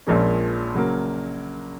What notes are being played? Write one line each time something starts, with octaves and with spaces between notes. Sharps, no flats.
A#1 A#2 F3 G#3 C#4
C#3 F#3 A#3